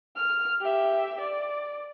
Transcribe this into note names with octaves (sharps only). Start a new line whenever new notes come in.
F6
G4 E5
D5